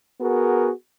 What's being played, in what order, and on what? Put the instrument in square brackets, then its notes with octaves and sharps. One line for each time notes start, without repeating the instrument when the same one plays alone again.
[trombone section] B3 F#4 G#4 A#4